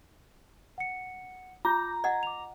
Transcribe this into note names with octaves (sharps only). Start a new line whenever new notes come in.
F#5 C#7
F4 A#5 D6 G6
D#5 F#5 G#6
D6 F7